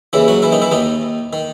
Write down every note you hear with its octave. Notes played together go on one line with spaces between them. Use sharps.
D#2 C#3 E3 E4
F#3 F#4
E3 E4
D#3 D#4
E3 E4
D#2 D#3 D#4
D#3